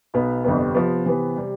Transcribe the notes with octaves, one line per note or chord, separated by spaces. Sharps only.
B1 B2 B3
G1 F2 C3 G3 B3
C3 F3 B3
C3 E3 B3
C3 G3